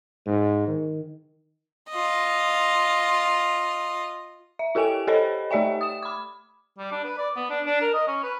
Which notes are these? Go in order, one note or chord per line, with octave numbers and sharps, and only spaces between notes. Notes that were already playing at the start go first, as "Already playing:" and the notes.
G#2
D#3
F4 D#5
E5
E4 G4 A4 G5 G#5 D7
G4 A4 C5 C#5 D#5 B5
A3 G4 D5 E5 G5
D#6 E7
B5 D6
G3
D4
B4
D5
B3
D4
D4
A#4
D#5
C#4
B4